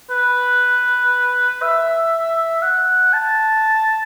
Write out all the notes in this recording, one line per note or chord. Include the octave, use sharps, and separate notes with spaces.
B4
E5
F#5
A5